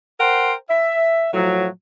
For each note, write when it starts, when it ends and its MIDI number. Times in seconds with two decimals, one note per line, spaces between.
0.20 0.53 70
0.20 0.53 72
0.20 0.53 78
0.20 0.53 79
0.20 0.53 84
0.70 1.27 76
1.33 1.66 45
1.33 1.66 53
1.33 1.66 54